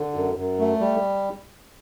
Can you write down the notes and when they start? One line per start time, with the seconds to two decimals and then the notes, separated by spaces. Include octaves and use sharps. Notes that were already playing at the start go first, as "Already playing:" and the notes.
Already playing: D3
0.14 F#2
0.36 F#2
0.59 A3
0.80 G3